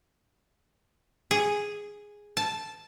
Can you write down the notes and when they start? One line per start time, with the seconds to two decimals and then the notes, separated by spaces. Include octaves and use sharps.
1.31 G#4
2.37 A5